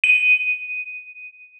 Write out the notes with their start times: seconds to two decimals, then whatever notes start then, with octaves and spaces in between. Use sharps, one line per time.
0.04 D#7